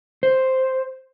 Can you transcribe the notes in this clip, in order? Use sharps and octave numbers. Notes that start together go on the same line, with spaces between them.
C5